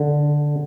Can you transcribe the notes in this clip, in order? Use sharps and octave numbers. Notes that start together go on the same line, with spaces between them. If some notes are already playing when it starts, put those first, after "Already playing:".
Already playing: D3